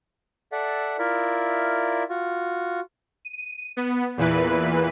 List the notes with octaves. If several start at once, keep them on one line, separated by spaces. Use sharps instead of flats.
A4 D5 E5 F#5
E4 F4 A#4 D5 E5
F4 F#4
D#7
B3
E2 A#2 E3 B4